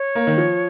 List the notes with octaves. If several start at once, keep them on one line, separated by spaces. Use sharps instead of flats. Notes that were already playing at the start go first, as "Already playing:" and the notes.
Already playing: C#5
A#3
D#3
F3